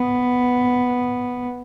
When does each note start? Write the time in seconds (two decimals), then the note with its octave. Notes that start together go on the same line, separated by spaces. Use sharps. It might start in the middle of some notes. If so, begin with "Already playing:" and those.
Already playing: B3